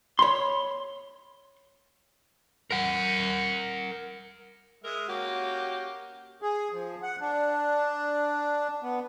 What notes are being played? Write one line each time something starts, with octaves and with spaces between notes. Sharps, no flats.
C#5 B5 C6
A#4 F#5
G#3 A#4 E5
A#3 C#4 F#4 G4
G#4
F3
F#5
D4
B3